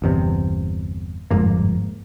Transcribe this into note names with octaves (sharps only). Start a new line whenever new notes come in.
G1 E2 C3
G1 F2 G#2 A#3